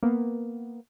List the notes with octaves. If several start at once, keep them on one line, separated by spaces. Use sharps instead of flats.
A#3 B3